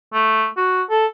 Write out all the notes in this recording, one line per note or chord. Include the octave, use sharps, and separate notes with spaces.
A3
F#4
A4